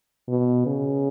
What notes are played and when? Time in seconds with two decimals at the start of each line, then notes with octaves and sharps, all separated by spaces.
0.28 B2
0.66 C#3